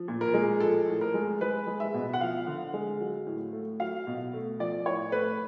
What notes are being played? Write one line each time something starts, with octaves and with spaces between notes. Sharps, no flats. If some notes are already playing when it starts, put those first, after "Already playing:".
Already playing: F3
A#2
A#4
G#3
F3 A4
A2
A#4
G#3
G#3 B4
G#3
E5
B2
F#5
F3 F5
D3
G#3
F#3
A2
A3
F#3 F5
B2
A3
F3 D5
A2 C#5
A3 B4